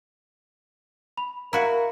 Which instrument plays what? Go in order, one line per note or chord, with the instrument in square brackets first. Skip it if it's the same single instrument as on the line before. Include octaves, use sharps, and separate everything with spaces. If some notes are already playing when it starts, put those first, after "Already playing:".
[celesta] B5 F7
[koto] E4 F#4 [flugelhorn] A#4 [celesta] E5 F5 A#5